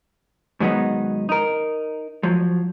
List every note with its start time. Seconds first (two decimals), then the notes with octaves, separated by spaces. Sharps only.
0.60 G#2 D#3 F#3 G3 B3 D#4
1.29 D#4 A#4
2.23 F3 F#3